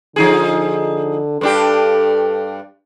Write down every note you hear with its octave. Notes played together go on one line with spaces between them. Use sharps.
D3 F3 D#4 G#4
G2 D4 G4 A4